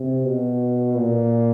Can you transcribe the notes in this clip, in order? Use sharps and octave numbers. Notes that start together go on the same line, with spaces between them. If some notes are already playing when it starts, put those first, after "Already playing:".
Already playing: C3
B2
A#2